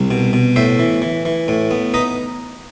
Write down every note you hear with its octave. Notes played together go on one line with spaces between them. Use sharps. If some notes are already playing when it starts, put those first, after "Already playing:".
Already playing: C2
B2
B2
A2 C5 E5
E3
E3
E3
A2
B3
D#4 B4 D#5